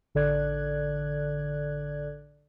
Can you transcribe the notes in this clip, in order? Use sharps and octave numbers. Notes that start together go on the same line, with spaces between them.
A1 D3 A4 D5 F#6 G#6